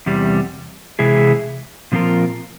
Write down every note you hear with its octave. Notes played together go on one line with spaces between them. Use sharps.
E2 C3 G3
C3 E3 G#3 E4 G#4
A#2 F3 C4 F4 A#4